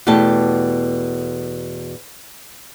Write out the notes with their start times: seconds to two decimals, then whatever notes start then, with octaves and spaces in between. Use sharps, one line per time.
0.07 E2 B2 A3 G4 A5